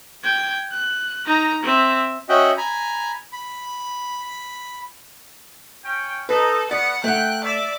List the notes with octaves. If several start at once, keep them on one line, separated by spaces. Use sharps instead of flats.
G5 G#6
F#6
D#4 A#5
C4 E5
C#4 F#4 D#5 E5 F#5 G5
G#5 A#5 B5
B5
C#4 G5
D#4 A4 B4
A3 B3 D5 F#5
A3 F#5 G5 F#6
D5 E5